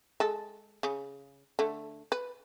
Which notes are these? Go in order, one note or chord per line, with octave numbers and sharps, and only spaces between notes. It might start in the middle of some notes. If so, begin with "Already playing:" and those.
G#3 A4
C#3
D3 A3
B4